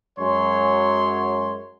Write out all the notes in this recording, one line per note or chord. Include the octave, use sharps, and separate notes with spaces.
F#2 F#3 G#3 C#5 C6